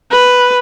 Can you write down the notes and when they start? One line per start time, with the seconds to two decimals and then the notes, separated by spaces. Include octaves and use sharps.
0.12 B4